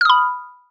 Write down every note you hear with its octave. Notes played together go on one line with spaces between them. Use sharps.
B5 D#6 F6